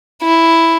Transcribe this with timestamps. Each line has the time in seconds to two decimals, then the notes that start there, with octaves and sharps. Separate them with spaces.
0.22 E4